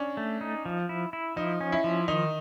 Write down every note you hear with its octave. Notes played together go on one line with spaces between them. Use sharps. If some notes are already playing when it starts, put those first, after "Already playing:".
Already playing: C#4 D4
A3
D#4
F3
E4
E4
F3 D#4
C#4
E4
F3
D#3 D#4